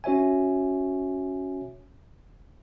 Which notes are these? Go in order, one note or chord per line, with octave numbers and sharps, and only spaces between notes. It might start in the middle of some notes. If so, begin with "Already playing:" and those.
C#4 F#4 C#5 E5 G#5